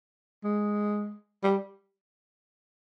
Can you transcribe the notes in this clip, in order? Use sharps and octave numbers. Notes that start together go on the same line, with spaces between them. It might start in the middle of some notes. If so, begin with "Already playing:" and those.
G#3
G3